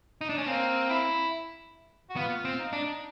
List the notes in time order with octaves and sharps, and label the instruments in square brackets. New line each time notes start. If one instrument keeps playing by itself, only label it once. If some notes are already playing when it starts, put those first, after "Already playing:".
[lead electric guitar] D#4
D4
C#4
[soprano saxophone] A#3 [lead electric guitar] C4
[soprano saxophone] E4
F#4
[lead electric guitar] B3 [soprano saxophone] F4
[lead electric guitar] C4
[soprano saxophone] D#4
[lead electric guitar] D4